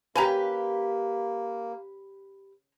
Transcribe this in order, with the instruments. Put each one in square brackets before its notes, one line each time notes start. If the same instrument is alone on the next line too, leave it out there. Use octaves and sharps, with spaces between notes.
[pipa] C#3 G#5 A#5 [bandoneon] A#3 [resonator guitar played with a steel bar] G4 B4